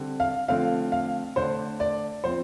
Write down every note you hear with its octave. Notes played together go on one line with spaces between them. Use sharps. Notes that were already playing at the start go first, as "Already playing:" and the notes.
Already playing: D3 G3 C4
F5
D3 F3 A3 C4 F5
F5
D3 A3 D4 C5
D5
F3 C4 C5